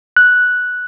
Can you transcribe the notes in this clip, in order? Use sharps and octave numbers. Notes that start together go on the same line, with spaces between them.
F#6